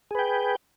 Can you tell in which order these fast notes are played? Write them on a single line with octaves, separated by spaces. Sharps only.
G#4 B4 G5